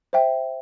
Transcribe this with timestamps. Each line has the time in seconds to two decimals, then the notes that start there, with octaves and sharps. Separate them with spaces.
0.13 C5 E5 G5